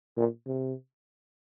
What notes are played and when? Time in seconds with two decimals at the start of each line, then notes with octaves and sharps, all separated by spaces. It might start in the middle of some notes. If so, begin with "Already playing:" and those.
0.18 A#2
0.47 C3